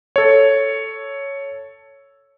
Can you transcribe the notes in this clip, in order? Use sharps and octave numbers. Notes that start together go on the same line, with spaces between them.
A4 C#5